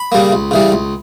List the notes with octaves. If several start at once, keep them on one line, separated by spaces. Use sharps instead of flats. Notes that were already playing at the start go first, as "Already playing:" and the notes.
Already playing: B5
C#3 G3 A#3
C#2
C#3 E3 G3
C#2